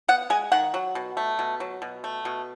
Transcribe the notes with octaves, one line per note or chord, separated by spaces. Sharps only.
B3 F#5
G#3 G#5
D#3 F#5
F#3
B2
A3
B2
F#3
B2
A3
B2